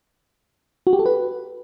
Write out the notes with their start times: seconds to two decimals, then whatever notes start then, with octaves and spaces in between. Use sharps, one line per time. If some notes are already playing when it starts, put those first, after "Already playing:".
0.87 F#4
0.93 G4
0.99 A4
1.06 B4